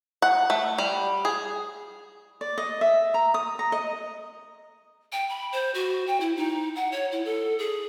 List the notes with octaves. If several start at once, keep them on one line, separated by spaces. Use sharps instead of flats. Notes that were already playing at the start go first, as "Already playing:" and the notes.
F#5
A3
G3
G#4
D5
D#5
E5
A#5
D#6
A#5
D#5
G5
B5
C5
F#4
G5
E4
D#4
F#5
C#5
E4
A4
G#4